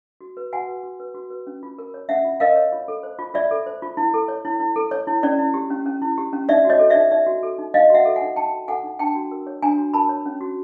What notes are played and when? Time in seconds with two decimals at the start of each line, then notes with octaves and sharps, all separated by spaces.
0.21 F#4
0.37 B4
0.53 F#4 F#5 G#5
0.68 B4
0.83 F#4
1.00 B4
1.15 F#4
1.30 B4
1.47 C#4
1.63 F4
1.78 A#4
1.94 C#5
2.09 C#4 E5 F#5
2.25 F4
2.40 A#4 D#5 F5
2.56 C#5
2.72 F4
2.88 A4
3.03 C5
3.19 F4
3.34 F4 D5 E5
3.51 A4
3.66 C5
3.82 F4
3.97 E4
4.14 A4
4.28 C#5
4.45 E4
4.60 E4
4.76 A4
4.91 C#5
5.07 E4
5.23 C#4 D5
5.39 E4
5.54 G4
5.70 C#4
5.86 C#4
6.02 E4
6.18 G4
6.33 C#4
6.49 D#4 D5 E5
6.65 F#4 C#5 D#5
6.79 A4
6.90 D#4 D5 E5
7.11 D#4 D5 E5
7.26 F#4
7.43 A4
7.58 D#4
7.74 D#4 D#5 F5
7.90 F#4 E5 F#5
8.05 A4
8.16 F#5 G#5
8.22 D#4
8.36 D#4 G5 A5
8.53 F#4
8.68 A4 F#5 G#5
8.83 D#4
8.99 D4 G5 A5
9.15 F#4
9.31 A#4
9.47 C#5
9.62 D4 G#5 A#5
9.78 F#4
9.94 A#4 A5 B5
10.09 C#5
10.26 C#4
10.41 F#4